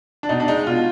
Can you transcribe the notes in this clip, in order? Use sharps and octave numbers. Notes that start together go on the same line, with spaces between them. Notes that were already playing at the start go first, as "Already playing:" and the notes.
D4
B2 D#4
D4
G#3 D#4
B2 F4